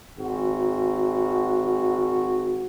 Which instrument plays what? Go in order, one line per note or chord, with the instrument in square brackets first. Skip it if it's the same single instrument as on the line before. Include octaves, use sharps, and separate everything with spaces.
[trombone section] G#1 F#4